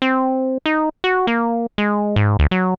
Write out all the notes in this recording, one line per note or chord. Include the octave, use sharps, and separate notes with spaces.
C4
D#4
F#4
A#3
G#3
G#2
D2
F#3